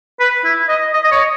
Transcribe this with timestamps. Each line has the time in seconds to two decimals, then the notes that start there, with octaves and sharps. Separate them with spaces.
0.20 B4
0.44 E4
0.69 D#5
0.93 D#5
1.04 D#5
1.12 C#5